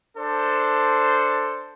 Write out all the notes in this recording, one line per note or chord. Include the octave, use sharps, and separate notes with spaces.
D4 A4 C5